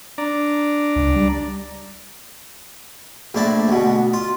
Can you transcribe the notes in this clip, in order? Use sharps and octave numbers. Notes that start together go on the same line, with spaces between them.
D4 D5 A#5
C#2
G3
A#1 A2 D4 A5 B5
D2 B2
F4